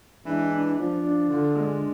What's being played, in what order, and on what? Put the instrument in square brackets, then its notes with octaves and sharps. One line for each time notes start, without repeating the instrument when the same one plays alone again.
[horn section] E3 G#3 [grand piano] D4
[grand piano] D4
[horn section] F3 [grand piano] D4
[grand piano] D4
[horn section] D3 [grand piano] F4
[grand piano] G#3